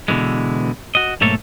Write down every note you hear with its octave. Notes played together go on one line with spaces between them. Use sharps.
B2 D3 E3 G#3
F#4 D#5
B1 G#2 A3 A#3 A4 C#5